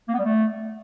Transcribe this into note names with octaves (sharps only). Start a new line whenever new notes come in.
A#3
B3
G3
A3